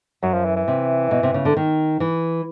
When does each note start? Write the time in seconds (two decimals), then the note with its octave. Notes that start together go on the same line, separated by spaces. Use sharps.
0.23 F#2 F#3
0.34 F3
0.45 E3
0.56 E3
0.68 C3
1.11 B2
1.23 C3
1.34 C#3
1.45 D3
1.57 D#3
2.00 E3